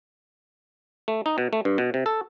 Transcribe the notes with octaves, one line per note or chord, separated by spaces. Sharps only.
A3
D#4
B2
A3
G2
B2
C3
A4